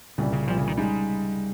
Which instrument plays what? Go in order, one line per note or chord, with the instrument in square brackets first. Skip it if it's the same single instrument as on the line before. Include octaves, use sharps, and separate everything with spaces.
[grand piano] C2 A#2 G3 [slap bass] C#3
[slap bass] C#3
[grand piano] C2 A#2 G3 [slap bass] F3
[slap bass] C#3
D#3
[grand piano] C#3 G#3 D#4 [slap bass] G3